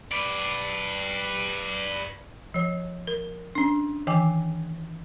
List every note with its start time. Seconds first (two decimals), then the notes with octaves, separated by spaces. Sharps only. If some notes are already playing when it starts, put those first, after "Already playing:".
0.12 B4 D5
2.54 F3 C#5
3.07 A#4
3.55 C#4 D4
4.07 D#3 E3 G5 G#5 D6